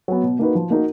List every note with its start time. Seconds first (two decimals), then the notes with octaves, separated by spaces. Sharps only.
0.08 F#3 B3
0.23 B2
0.39 A#3 D#4 F#4 B4
0.55 F3
0.70 A#3 D#4 F#4 A#4